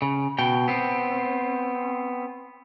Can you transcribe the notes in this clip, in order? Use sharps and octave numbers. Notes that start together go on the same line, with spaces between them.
C#3
B2 G5
B3 C4